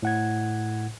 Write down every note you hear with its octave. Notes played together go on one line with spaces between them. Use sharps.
A2 F#5 G#6